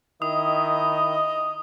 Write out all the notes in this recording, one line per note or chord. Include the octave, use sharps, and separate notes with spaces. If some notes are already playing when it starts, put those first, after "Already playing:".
D#3 E4 D#5 D#6